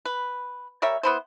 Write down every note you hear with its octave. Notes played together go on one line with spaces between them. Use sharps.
B4
G3 A#4 C#5 E5
B3 E4 C5